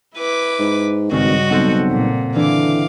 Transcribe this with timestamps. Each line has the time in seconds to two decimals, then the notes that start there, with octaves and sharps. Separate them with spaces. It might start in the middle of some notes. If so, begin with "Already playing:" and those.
0.15 E4 B4 D6
0.59 G#2
1.11 G#1 G2 C#3 F#4 D#5
1.50 B1 C4 A4 F#5
1.91 A#2
2.36 D3 E3 F5 D6